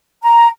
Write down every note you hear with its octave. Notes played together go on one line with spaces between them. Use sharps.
A#5